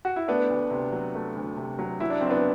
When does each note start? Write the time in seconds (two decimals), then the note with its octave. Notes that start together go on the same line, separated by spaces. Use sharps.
0.05 F#4
0.16 E4
0.28 A3 B3 D4
0.50 D2
0.71 C3
0.92 F#3
1.15 A3
1.36 D2
1.57 C3
1.79 F#3
2.00 F#3 E4
2.10 D4
2.21 F#1 C4
2.30 B3 D4